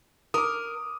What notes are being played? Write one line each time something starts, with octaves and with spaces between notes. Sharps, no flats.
A#4 D6 D#6